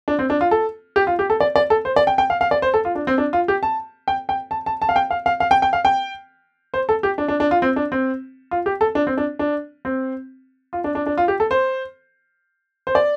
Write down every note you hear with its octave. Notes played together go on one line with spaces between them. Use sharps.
D4
C4
D4
F4
A4
G4
F4
G4
A4
D5
D5
A4
C5
D5
G5
G5
F5
F5
D5
C5
A4
F4
D4
C4
D4
F4
G4
A5
G5
G5
A5
A5
A5
F5
G5
F5
F5
F5
G5
G5
F5
G5
C5
A4
G4
D4
D4
D4
F4
C4
D4
C4
F4
G4
A4
D4
C4
D4
D4
C4
F4
D4
D4
D4
F4
G4
A4
C5
C5
D5